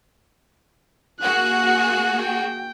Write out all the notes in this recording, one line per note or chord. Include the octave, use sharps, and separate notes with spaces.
A#3 F#4 G#4 F#6
G5